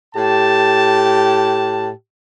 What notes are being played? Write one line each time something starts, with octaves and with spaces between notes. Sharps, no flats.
A2 G4 A5